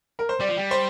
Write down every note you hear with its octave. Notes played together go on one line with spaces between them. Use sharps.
A#4
C5
G3 D5
F3
G3
C5